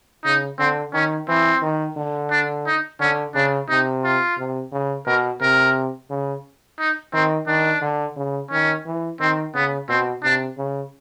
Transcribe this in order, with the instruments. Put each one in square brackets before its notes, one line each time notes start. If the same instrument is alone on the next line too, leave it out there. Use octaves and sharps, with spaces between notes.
[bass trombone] C#3 [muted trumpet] D#4
[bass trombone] D3 [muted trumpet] C4
[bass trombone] D#3 [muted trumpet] C#4
[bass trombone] E3 [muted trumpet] C4
[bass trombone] D#3
D3
[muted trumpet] D4
D#4
[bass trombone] D3 [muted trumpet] C#4
[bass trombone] C#3 [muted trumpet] D4
[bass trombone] C3 [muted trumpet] D#4
[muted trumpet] F4
[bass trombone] C3
C#3
[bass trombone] B2 [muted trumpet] A#4
[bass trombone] C3 [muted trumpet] A#4
[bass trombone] C#3
[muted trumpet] D#4
[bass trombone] D#3 [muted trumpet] C4
[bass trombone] D#3 [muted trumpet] D4
[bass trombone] D3
C#3
[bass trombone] D#3 [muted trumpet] C#4
[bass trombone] E3
[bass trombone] D#3 [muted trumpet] C4
[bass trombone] C#3 [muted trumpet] B3
[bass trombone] B2 [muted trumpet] C4
[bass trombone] C3 [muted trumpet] D4
[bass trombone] C#3